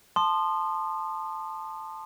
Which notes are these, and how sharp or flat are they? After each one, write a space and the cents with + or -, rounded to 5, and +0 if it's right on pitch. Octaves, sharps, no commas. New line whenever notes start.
A5 +0 C6 +0 D#6 -35